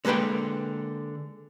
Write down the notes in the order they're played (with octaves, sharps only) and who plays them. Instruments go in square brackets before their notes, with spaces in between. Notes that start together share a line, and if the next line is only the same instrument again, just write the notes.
[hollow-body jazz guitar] D3 G#3 A#3 B4 G5